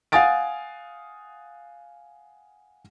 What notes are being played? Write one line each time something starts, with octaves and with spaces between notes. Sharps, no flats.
F5 F#5 G#5 D#6 A6 D7